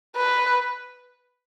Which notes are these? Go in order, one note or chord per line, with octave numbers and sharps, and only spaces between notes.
B4